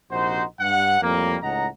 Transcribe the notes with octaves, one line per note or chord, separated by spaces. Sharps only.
A#1 C3 D#4 F#4 C5
G2 F#5
F2 A2 G3 A#3
C#2 A2 D#4 F#5 A#5